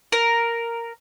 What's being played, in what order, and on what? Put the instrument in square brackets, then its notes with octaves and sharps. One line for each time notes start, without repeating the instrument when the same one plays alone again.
[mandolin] A#4